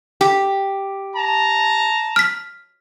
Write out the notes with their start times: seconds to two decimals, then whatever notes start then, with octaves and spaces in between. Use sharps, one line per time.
0.21 G4
1.15 A5 A#5
2.16 F6 B6